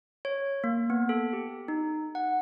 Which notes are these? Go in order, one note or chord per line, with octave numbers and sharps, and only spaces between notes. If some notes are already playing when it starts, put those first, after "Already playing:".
C#5
A#3
B3
A4
G4
D#4
F#5